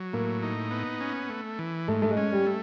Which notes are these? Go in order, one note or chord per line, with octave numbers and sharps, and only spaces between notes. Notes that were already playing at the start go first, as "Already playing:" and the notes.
Already playing: F#3
A2 A#3
D#4
B3
C#4
A3
E3
G#2 A3
A3
G#3
C#4
G3
A3